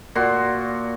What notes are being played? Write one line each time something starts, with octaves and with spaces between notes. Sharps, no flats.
A#2 F#4 C6